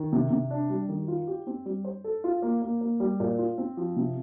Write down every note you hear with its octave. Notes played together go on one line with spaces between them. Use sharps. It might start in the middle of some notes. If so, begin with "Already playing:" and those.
Already playing: D#3
C3
C3
D4
G3
D#3
F4
G4
C4
G3
C5
A4
F4
A#3
A#3
A#3
G3
A#2
F4
C4
F3
C3